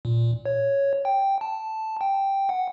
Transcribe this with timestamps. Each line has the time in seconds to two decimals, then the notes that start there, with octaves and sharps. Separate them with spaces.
0.05 A#2
0.46 C#5
1.05 G5
1.41 A5
2.01 G5
2.49 F#5